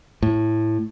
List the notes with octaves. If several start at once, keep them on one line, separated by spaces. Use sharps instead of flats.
A2